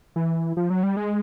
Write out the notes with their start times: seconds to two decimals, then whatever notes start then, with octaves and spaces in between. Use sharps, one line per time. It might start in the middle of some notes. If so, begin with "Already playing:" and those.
0.16 E3
0.57 F3
0.70 F#3
0.83 G3
0.97 G#3